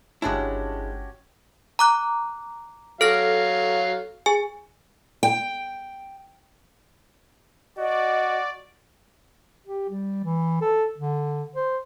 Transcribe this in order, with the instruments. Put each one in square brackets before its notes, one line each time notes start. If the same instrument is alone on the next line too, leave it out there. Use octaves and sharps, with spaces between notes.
[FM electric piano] G1 A5 [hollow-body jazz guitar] G#3 D4 E4 [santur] C#4 F#4 G4
[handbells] A#5 D6 F#6
[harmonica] F#3 F5 [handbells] A4 F6 A#6
[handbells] G#4 G#5
[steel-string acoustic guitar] G5
[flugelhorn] F#4 [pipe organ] D5 [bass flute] D#5
[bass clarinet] G4
G3
E3
A4
D3
C5